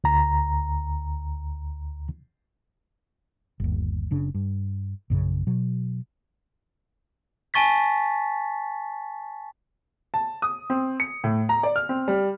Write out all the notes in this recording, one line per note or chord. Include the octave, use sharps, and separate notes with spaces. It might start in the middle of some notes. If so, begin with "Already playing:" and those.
D2 A#5
G1 D#2
F#1 C#3 D4
G2
A#1 F#2 C#3
B2 F#3
G#5 A5 C#6 A6 B6
A5
D#6
C4
C#7
A2
A#5
D5
F6
C4
G3